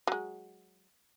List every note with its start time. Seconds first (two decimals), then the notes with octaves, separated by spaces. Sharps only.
0.07 F#3 G#3